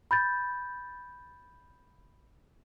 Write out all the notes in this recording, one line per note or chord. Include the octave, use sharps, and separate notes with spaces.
B5 G6 A6